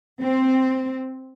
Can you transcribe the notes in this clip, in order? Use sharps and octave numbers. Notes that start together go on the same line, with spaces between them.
C4